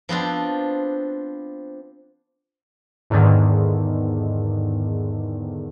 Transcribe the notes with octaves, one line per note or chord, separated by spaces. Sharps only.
F3 B3 C4 D4
E2 G#2 D3 D#3